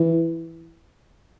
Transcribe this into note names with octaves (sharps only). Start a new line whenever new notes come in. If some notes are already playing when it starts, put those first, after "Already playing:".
Already playing: E3